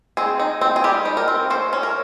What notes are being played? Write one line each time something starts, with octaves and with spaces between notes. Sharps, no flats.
C4 G#4
D#4
C4
G#4
G3 G4
D#4
A#4
C4
C#4 C5
C#4
A#4